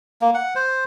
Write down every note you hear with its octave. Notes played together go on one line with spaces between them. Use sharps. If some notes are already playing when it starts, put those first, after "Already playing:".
A#3
F#5
C5